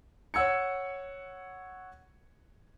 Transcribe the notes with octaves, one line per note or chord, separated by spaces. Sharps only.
C#5 F#5 E6 G#6 C#7